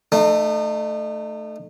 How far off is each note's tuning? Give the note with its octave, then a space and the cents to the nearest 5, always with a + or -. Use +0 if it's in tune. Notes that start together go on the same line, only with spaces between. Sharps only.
A3 +0 D#4 -40